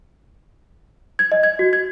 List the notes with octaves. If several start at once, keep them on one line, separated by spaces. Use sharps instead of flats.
G#6
D#5
G#6
F#4
G#6